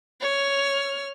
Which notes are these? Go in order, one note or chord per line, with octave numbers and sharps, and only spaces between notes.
C#5 F6